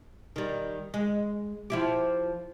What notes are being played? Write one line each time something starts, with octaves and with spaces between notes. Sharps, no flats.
D#3 G3
G#3
F3 E4 G4